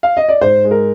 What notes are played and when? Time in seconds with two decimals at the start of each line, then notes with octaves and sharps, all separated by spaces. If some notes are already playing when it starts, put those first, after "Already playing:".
0.03 F5
0.17 D#5
0.29 D5
0.41 G#2 C5
0.64 G#3
0.71 A#4